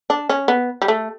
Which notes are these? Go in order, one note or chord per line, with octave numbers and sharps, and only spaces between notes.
D4
C#4
B3
G3
A3